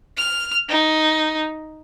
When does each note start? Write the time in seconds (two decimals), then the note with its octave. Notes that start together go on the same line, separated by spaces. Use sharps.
0.17 F6
0.69 D#4